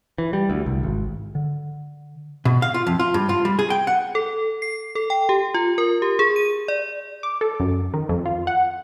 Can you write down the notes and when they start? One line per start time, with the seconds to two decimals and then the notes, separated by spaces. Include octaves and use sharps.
0.18 E3
0.33 G3
0.50 D2
0.66 C2
0.83 G#1
1.35 D3
2.45 B2
2.62 F5
2.74 F4
2.87 F2
2.99 F4
3.14 G2
3.29 F4
3.45 G3
3.59 G#4
3.70 G5
3.87 F#5
4.15 A4
4.62 C7
4.95 A4
5.10 G5
5.29 G4
5.54 F4
5.78 A#4
6.02 G4
6.19 G#4
6.36 D#7
6.68 D5
7.23 D6
7.41 A4
7.60 F#2
7.94 D#3
8.09 F2
8.26 F4
8.47 F#5